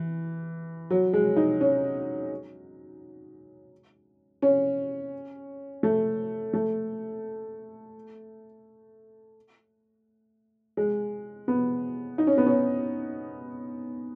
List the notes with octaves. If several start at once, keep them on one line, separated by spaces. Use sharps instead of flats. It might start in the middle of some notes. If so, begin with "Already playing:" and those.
Already playing: E3
F#3
G#3
D#4
C#4
C#4
A3
A3
G#3
B3
D#4
C#4
B3
C#4